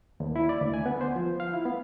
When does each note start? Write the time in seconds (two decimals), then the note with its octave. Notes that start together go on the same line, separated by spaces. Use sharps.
0.20 D#2
0.36 E4
0.49 D5
0.61 D2
0.74 G#5
0.86 B3
1.01 C5
1.16 F3
1.40 F5
1.54 E4
1.65 B3